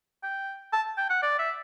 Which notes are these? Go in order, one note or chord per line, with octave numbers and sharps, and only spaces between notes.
G5
A5
G5
F#5
D5
E5